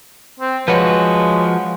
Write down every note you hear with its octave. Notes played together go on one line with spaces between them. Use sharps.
C4
F3 G#3 F#4 B4 C#5